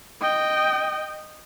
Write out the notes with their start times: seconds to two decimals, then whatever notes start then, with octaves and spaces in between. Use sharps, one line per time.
0.21 D#5 G5